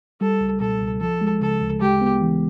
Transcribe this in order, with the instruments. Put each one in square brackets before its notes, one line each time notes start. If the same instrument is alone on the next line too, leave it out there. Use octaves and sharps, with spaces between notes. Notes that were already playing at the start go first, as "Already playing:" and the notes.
[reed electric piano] G3 [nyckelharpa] A4
[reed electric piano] C#2
[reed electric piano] B2 [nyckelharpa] A4
[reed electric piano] C#2
[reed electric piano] F3 [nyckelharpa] A4
[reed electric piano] G#3
[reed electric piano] C#3 [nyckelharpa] A4
[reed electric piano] D2
[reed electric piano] G#3 [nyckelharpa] G4
[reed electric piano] B3
E3